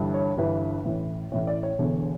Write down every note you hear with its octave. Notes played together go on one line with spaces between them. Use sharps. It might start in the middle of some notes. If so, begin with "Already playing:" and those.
Already playing: G1 G2 E3
C#5
G1 G2 E3 B4
A1 A2 E3
A1 A2 E3 C#5
D5
C#5
E1 E2 D3